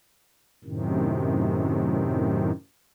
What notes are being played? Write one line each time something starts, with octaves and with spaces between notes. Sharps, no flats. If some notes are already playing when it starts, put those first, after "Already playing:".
F#2 A2 C3 D#3